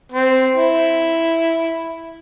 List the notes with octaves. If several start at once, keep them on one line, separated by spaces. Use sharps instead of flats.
C4
E4